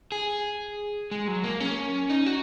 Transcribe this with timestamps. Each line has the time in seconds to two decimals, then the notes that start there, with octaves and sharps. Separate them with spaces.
0.12 G#4
1.11 G#3
1.28 F#3
1.44 A#3
1.60 C#4
2.10 D#4
2.26 F#4